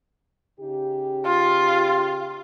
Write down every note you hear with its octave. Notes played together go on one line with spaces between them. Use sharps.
C#3 D#4 G4
F4